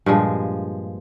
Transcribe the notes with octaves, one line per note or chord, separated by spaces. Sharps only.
G2 A#2 F3 G#3